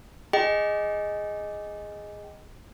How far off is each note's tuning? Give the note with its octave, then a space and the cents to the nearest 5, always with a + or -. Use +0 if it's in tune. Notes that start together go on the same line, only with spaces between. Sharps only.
G#4 +0 D#5 +0 G5 -30